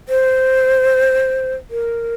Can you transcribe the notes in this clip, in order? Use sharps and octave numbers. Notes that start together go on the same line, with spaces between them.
C5
A#4